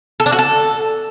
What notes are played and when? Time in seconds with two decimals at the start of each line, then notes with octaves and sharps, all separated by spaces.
0.20 A4
0.26 D4
0.32 F#4
0.39 A4